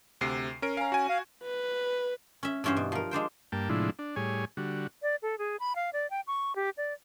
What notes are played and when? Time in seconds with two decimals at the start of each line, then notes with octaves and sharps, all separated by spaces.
0.21 D2 C3 C7
0.62 C#4 A#4 D7
0.77 C#4 F5 A#5
0.92 F#4 G#5
1.09 F5
1.44 B4
2.43 C#4 E5
2.64 G2 E3 C#4 F#4 C5
2.77 B2
2.92 F3 A#4
3.11 G#3 D4 C5 G5
3.52 G2 A#3 G5 A5
3.69 A2 C3 F3 G#3 D4 E4
3.99 D4
4.16 A2 G3 G#4 C#5 G#5
4.57 D3 G3 F#4
5.02 D5
5.22 A4
5.38 G#4
5.60 B5
5.76 F5
5.93 D5
6.10 G5
6.27 C#6
6.56 G4
6.77 D5